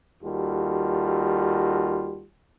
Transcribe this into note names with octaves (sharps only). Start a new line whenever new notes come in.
D#2 G3 F4 F#4 A4